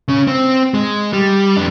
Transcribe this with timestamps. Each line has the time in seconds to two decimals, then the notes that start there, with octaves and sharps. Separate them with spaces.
0.08 C#3 C#4
0.27 C4
0.74 G#3
1.13 G3
1.57 F2 D4